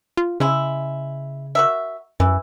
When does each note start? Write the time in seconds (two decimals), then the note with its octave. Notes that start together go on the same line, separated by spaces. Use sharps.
0.17 F4
0.40 C#3 G#3 E4
1.55 F#4 A#4 E5
2.20 F#2 E3